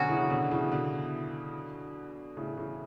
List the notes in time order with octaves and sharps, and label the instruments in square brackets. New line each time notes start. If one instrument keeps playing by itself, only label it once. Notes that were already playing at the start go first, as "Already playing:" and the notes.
Already playing: [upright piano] B2 D3 [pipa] F#3 C#4 F#4
[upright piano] C#3 E3
B2 D3
D3
C#3 E3
B2 D3
A2 C#3
C#3 E3